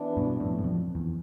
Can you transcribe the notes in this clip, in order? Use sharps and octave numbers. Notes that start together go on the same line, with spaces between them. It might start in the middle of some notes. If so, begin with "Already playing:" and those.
Already playing: E3 B3 D4
G2 B2
F2 A2
G2
F2
E2